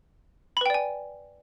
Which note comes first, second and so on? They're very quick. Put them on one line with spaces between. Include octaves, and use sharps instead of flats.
B5 B4 G5 D5 G#5